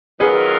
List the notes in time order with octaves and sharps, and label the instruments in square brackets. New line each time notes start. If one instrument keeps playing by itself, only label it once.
[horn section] D#3 F#3 B3 F4 A#4 [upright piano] G#4 B4